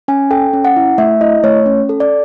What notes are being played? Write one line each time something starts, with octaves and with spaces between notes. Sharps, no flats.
C#4 G#5
A4 G5
C#4
F#5
E4
A3 E5
E4 D#5
A3 C#5
C#4
A4
D5